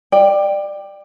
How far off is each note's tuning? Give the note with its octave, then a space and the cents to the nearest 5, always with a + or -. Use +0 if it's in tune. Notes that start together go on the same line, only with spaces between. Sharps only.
D5 +20 G5 +0